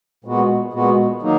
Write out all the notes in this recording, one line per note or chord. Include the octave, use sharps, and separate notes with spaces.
A#2 G#3 B3 F#4
A#2 G#3 B3 F#4
D#3 F#3 A#3 D#4